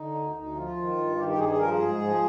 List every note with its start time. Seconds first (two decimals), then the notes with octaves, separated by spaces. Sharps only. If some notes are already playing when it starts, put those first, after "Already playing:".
Already playing: D3 D#4
0.15 D2
0.35 D2 D#4
0.56 F3 F4
0.77 D#3
0.97 G2
1.17 D#3 G4
1.29 G4
1.38 G2 G#4
1.49 G#4
1.59 F3 A#4
1.70 G#4
1.79 G#2
2.01 F3